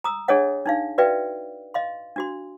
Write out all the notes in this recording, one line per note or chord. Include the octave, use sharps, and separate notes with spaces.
A#5 D#6 E6
D4 G#4 A4 C#5 D#5 F#5
D4 D#4 F5
F#4 B4 D5 E5 F5 G5
D#5 F5 C6
D4 F#4 C6